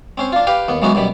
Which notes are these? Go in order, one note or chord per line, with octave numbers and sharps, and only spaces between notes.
C4 C#4 C5
D4 F4
G4 B4 F5 G5
D#2 B3
E3 F#3 G#3 B3 C#4 F#4
F#2 B2 G3 B5